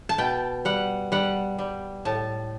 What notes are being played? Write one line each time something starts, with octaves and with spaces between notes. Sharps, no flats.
A5
B2 G5
G3 F#5
G3 F#5
G3
A2 A5